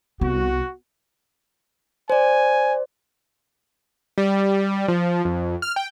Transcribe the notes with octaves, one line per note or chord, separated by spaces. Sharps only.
C2 B3 F#4
C5 D5 G#5
G3
F3
F2
F6
G5